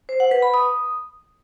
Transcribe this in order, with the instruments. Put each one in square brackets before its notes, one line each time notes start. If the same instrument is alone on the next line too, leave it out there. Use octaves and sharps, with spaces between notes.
[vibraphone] C5
F#5
B4
B5
D#6